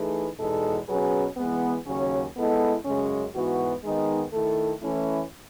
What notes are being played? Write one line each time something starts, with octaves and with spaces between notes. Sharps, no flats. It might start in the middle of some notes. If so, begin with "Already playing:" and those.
Already playing: E3 A3 D#4 G#4 B4
E2 B2 G#3 D#4 A4
B2 F#3 C#4 G#4 B4
E3 G#3 B3
D#2 C#3 F#3 C#4
G#3 B3 E4 A4 D#5
F#2 C#3 G#3 C#4
G#2 E3 B3 F#4
D#3 G#3 B3 D#4
D#3 A3 E4 A4
E3 A3 C#4 E4